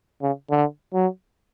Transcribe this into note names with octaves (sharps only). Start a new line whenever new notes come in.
C#3
D3
F#3